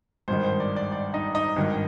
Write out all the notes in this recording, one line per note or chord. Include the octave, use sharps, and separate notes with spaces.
G#1 G2 D#3 C5
C5
D5
D5
D5
D#4 D#5
D#4 D#5
G#1 G2 D#3